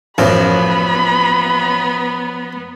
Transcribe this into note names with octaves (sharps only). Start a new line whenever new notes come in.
A1 F#2 F3 B3 F4 B5